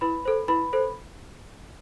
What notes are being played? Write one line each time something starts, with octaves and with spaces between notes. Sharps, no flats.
E4 B4 B5
A4 C5
E4 B4 B5
A4 C5